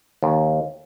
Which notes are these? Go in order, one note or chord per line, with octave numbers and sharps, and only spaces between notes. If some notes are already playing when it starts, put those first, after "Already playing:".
D#2